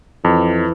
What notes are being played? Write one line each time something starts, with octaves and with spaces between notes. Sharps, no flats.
F2 E3